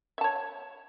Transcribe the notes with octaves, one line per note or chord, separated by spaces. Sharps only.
C#5 E5 A5